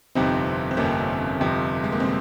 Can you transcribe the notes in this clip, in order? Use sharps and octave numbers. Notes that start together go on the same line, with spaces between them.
G1 F2 C3 C4 D#4
C4
G1 F2 C3 A#3 C#4
G1 F2 C3
G#3
A#3
C3 G#3 C4